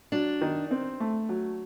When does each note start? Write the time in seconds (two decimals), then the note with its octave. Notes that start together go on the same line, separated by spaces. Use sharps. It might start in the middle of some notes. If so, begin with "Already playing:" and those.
0.12 F#3 D4
0.41 D#3
0.71 C4
1.00 A3
1.29 F#3